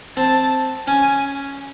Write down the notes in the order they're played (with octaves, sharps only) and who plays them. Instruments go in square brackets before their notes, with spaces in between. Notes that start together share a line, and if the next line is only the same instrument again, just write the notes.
[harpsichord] C4 [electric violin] A5
[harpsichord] C#4 [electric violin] G#5